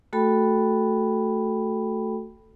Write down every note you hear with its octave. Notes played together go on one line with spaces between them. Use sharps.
A3 F#4 A4 G5 B5